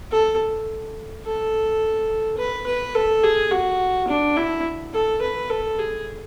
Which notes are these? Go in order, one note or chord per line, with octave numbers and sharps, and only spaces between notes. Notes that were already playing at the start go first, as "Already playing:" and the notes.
A4
A4
B4
B4
A4
G#4
F#4
D4
E4
A4
B4
A4
G#4